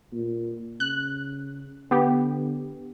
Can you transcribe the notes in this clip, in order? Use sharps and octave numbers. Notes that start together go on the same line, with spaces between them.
A#2
C#3 F#6
D3 B3 G4